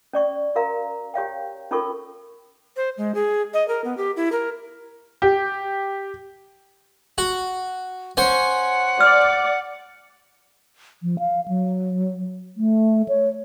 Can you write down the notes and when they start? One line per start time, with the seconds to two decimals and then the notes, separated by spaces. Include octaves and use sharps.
0.13 C#4 D5 C#6
0.56 F#4 A#4 F5 A#5
1.14 G4 C#5 F5 G5
1.71 C#4 D#4 F4 A4 A#4 C#6
2.76 C5
2.98 G#3
3.15 G#4
3.54 D#5
3.68 A#4
3.84 B3
3.97 G4
4.17 E4
4.32 A#4
5.22 G4
7.18 F#4
8.17 C#4 C5 F#5
9.01 D5 F6
11.03 F3
11.19 F5
11.48 F#3
12.57 A3
13.08 C#5